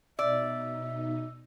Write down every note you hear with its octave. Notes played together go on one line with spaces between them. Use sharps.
B2 D#4 D5 E5 E6